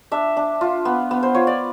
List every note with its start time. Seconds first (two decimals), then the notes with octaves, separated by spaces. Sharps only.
0.12 D4 E5
0.37 D4
0.61 F4
0.85 B3
1.11 B3
1.23 C5
1.35 F4 C#5
1.47 D5